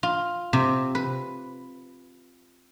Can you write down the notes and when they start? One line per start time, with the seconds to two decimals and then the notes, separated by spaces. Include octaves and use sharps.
0.03 F4
0.53 C3
0.95 B4